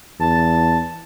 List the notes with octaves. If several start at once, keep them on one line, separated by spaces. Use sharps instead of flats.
E2 A5